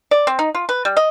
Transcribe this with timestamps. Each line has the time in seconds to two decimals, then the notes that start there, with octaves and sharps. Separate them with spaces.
0.11 D5
0.27 C4
0.39 D#4
0.55 F4
0.69 B4
0.85 G3
0.97 D#5